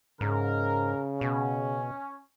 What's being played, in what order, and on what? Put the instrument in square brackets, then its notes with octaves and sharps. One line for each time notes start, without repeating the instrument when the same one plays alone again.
[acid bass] G#2 [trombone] C#3 [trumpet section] A#4
[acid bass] B2 [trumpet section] C#4